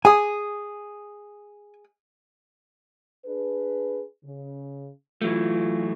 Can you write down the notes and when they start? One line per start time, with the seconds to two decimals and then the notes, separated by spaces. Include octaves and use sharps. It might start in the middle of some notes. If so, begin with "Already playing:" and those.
0.05 G#4 G#5 D#6
3.26 D4 G#4 B4
4.25 C#3
5.22 E3 F#3 A3 F4